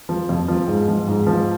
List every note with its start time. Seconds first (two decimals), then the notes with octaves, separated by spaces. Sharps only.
0.09 F3
0.29 F2
0.48 F3
0.68 G#2
0.88 F3
1.07 G#2
1.27 F3